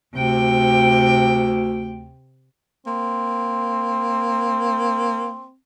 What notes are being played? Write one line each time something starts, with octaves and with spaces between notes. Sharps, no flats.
D2 C3 G5
A#3 C4